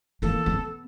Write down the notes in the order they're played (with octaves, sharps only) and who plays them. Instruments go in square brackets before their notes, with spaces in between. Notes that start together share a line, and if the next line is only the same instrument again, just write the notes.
[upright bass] E3 A#3 [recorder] A4
[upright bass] B3